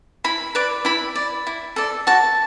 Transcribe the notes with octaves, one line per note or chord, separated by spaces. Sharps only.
E4 B5
B4 D5 D6
E4 B5
D5
E4
A4 D5
F#4 A5